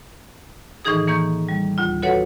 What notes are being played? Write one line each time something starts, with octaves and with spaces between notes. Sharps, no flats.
A2 D#3 E3 D#4 G#4 D#6
E3 A#3 C#6 G6
G3
D2 F4
F#4 A4 B4 C#5 F#5